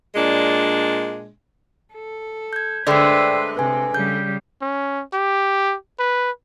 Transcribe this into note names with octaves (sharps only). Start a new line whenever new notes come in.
A#2 G#3 D4
A4
G6 G#6
D3 G#3 A3 B4 C5 D5 G5 E6
C3 B4 G#5
C#3 G3 G6
C#4
G4
B4